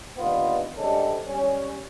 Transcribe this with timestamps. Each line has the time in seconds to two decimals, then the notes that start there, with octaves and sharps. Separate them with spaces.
0.17 G2 A#2 D#3 B3 F4
0.76 C3 G3 G#3 C#4 D4 A4
1.26 G3 C#4